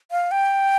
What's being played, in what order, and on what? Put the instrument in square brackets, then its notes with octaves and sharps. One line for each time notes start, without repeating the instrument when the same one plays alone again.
[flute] F5
G5